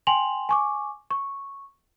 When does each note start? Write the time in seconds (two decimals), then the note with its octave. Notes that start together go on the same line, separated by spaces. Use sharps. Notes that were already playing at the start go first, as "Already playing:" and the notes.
0.07 G5 G#5 C6 F7 F#7
0.49 G#5 C#6 D6
1.11 C#6